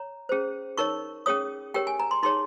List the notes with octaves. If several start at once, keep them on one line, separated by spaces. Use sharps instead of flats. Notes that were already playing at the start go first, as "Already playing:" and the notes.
Already playing: C#5 A#5
C#4 G#4 C5
D#4 A#4 C#5 C#6
C#4 G#4 C#5 D#6
G4 A#4 C#5 G5
G#5
A#5
C6
D#4 G#4 C#5 C6